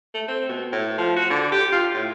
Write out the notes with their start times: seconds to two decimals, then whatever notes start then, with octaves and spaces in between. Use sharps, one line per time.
0.14 A3
0.28 C4
0.49 B2
0.72 A2
0.98 F3
1.16 F#4
1.30 D3
1.52 G4
1.72 F4
1.95 A2